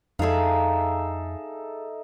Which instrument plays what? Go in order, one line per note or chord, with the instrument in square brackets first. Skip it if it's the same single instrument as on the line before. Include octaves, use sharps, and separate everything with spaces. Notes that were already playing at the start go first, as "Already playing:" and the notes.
[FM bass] F2 [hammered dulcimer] D#4 A4 E5 [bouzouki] G#4 F5